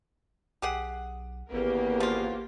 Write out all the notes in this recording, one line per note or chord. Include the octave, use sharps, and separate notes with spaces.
B1 G4 G#4 F#5
G#1 E2 C#3 A#3 B3 G4 A#4
F3 F4